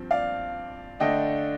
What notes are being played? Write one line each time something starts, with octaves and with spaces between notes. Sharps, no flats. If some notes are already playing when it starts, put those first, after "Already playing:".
Already playing: G2 F3 C4
D5 F5
D3 A3 D4 D#5 G5